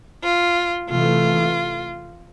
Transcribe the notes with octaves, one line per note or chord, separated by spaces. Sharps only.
F4
C3 E3 A3 F4